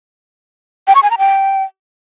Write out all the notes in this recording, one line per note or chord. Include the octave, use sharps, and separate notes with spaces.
G5
C#6
G#5
A#5
G5